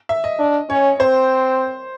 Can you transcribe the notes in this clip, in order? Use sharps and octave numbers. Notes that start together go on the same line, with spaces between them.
E5
D#5
D4
C#4 C#5
C4 C5